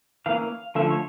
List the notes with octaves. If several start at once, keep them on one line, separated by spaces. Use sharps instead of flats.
E3 A#3 C#4 F5
D3 F3 A3 C#4 E5
C#5